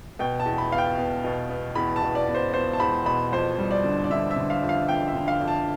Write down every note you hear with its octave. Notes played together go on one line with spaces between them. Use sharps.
B2 G5
A5
E2
B5
B3 F5
G5
B3
B2
B3
E2 B5
A5
B2
D5
B3
C5
B3 C5
A5
E2 B5
B2 B5
F2 C5
G3
D5
D3
D5
D3 E5
E5
D3
F5
F2
F5
F2 G5
E5
D3
F5
F2
A5